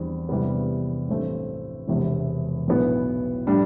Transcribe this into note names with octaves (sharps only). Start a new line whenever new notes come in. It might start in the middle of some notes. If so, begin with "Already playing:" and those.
Already playing: E2 D3 G3 C4
E2 C3 G3 B3
A1 G2 E3 A3 C4
E1 E2 C3 E3
B1 A2 E3 B3
A2 G3 D4